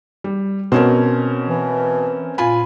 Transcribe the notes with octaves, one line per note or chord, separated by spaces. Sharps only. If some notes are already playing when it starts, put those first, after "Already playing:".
G3
B2 C4 C#4 A#4
E3
A#2 F4 G#5 B5